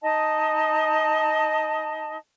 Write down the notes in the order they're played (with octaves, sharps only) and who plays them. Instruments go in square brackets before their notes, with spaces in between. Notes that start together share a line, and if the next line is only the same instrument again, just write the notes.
[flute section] D#4 D#5 A5